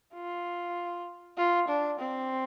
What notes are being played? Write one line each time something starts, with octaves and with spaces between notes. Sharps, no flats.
F4
F4
D4
C4